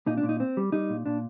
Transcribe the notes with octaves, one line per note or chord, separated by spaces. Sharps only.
A#2 D#4
D4
A#2
D#4
C4
G3
G3 D#4
A#2
A#2 D4